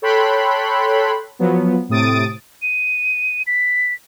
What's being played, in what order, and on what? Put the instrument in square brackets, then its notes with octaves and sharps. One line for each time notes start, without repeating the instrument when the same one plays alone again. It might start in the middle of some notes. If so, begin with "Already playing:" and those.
[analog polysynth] A4 C#5 G5 B5 C6 F#6
F3 F#3 B3
A2 C3 D#6 A6 D7
[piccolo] D#7
B6